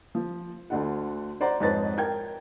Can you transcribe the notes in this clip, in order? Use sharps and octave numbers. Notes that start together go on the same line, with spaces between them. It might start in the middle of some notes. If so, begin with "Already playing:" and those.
F3
D2 D3 F#5
C5 D5 F#5 A#5 C6
F2 G#2 B4 C#5 A6
A#4 G5 G#6